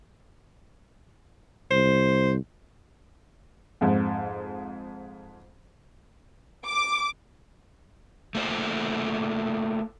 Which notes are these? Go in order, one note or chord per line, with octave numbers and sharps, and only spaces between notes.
C2 C5
F2 G#2
D6
A3 A#3 F4 C5